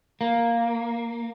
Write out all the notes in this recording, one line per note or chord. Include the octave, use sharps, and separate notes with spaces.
A#3